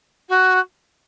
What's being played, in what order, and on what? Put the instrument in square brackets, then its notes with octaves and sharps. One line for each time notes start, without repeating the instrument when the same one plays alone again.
[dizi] F#4